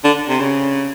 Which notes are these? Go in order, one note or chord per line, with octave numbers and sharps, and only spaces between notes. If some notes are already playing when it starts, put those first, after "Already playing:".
D3
C3
C#3